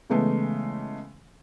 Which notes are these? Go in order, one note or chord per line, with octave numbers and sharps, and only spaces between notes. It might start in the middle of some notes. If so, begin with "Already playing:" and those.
C#3 E3 G#3 A3 B3